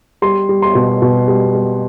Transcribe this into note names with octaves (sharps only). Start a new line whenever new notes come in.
G3 C6
G3
C6
B2
B2
G3
G3